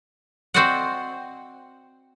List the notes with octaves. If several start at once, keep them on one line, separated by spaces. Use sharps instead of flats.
C4 F#4 C5 D5 D#5 F#5